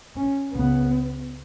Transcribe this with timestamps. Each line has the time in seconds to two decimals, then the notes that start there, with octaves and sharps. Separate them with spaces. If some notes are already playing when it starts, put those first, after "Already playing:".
0.17 C#4
0.53 C#2 C#3 B3